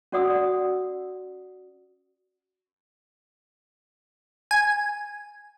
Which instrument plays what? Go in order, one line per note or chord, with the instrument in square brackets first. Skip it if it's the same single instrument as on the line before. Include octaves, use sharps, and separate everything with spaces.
[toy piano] C#4 F#4 D5 F#5 D#6 E6
[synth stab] G#5